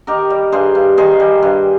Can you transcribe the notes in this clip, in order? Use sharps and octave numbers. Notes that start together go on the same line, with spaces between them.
D#3 G4 A#4
G3
G2 G#4 C5
G2
D#3 G#4 C5
G3
G2